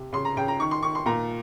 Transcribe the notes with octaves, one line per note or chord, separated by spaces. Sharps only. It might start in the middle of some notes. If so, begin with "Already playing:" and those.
Already playing: C3
C#3 C6
A#5
C#3 G5
A#5
D#3 C#6
C6
D#3 C#6
C6
A#2 A#5